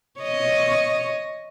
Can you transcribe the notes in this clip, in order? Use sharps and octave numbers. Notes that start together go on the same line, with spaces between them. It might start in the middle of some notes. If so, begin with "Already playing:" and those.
C#5 D#5